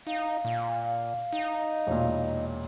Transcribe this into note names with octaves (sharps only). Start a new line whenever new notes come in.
D#4 F5
A#2
D#4
E1 A#2